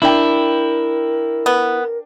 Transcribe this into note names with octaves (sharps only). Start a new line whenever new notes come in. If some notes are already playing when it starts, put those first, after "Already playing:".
D4 E4 A#4 G5
B3